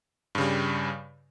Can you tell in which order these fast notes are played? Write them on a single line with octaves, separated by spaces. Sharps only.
G2 C#3 G3